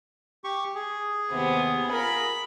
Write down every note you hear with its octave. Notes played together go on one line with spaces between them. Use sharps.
G4 C#6
G#4
D#2 C3 B3
F4 A#4 B5